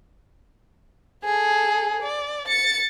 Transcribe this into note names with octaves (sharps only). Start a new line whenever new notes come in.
G#4 A4
D5
A6 C#7